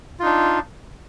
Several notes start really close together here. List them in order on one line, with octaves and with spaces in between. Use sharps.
F4 D#4 D4